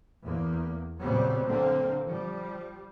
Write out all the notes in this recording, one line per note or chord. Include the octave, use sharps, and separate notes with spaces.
E2 A#3
A#2 C#3 F#3 G3 B3 C4
D3 A#3 C4
F3 G3